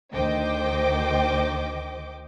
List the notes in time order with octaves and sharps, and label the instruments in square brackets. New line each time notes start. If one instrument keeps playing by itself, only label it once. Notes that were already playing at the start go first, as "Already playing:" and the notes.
[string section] D2 D#3 C5 D#5 G5 D6